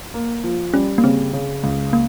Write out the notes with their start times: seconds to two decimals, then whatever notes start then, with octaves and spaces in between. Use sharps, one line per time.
0.14 A#3
0.44 F3
0.73 G3 C#4
0.98 A#3
1.04 C#3 C4
1.33 C#3
1.63 C#2
1.93 A#3